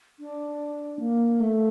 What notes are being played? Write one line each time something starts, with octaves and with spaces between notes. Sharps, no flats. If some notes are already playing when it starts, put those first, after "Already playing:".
D4
A#3
A3